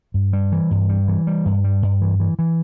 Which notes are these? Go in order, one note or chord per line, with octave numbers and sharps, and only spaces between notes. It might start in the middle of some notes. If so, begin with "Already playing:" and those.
G2
G3
E3
G2
G3
E3
G3
G2
G3
G2
E3
E3
E3